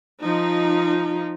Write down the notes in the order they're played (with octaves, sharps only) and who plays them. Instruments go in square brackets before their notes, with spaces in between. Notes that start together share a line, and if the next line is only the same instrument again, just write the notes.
[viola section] F3 D#4